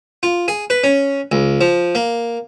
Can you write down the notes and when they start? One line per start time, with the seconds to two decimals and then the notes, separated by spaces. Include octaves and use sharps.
0.23 F4
0.48 G#4
0.70 B4
0.84 C#4
1.32 C#2
1.61 F3
1.95 A#3